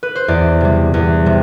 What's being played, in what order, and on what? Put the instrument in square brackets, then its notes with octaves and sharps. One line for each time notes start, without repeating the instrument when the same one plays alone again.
[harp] B4
C5
E2 D5
C3 G3
E2
C3 G3